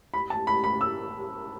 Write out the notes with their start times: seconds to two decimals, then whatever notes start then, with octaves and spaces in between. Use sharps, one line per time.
0.14 B5
0.30 A5
0.47 B5
0.64 B5
0.81 E6